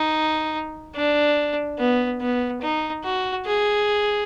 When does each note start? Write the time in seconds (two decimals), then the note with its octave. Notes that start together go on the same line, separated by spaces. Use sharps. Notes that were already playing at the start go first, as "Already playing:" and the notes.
Already playing: D#4
0.95 D4
1.78 B3
2.21 B3
2.61 D#4
3.04 F#4
3.46 G#4